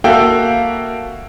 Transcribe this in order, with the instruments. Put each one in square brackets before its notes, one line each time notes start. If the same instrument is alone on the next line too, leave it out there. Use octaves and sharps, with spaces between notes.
[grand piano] A#3 F#4 A4 E5 F5 G5